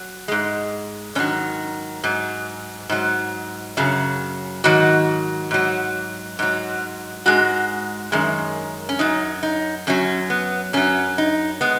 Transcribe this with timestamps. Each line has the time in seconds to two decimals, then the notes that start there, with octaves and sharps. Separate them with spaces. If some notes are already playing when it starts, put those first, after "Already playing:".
Already playing: F#3
0.28 G#2 G#3
1.15 G#2 C#4
1.19 D#3 F#3
2.04 G#2 F#3
2.89 G#2 F#3
3.77 F#2 C#3 F#3
4.64 G#2 D#3 F#3 F#4
5.51 G#2 F#3
6.39 G#2 F#3
7.26 G#2 G#3 F#4
8.12 F#2 D#3 G#3
8.89 C#4
8.99 F#2 F#3 D#4
9.43 D#4
9.87 F#2 F#3 C#4
10.30 B3
10.73 F#2 F#3 C#4
11.18 D#4
11.61 G#3 B3